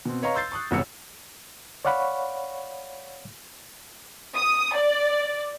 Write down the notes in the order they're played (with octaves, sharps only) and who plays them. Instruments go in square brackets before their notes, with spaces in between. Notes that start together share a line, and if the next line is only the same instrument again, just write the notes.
[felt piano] B2 C4
B4 C#5 D#5 F5 A#5 C#6
C6 E6 G6 A6 C7
C#6 D#6 F#6
E1 C2 B2 C#5 E6 C#7
[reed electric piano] C#5 D5 F5 F#5 B5 C#6
[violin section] D#6
D5